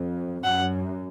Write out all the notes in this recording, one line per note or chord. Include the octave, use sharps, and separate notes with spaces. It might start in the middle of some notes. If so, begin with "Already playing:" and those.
Already playing: F2
F#2 F#5